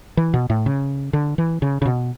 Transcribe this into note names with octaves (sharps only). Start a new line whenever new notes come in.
E3
B2
A2
C#3
D3
E3
C#3
C#3
B2